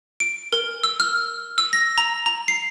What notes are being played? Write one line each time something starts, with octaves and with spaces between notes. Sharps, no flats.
D7
A#4
E6
F6
E6
A#6
A#5
A#5
C7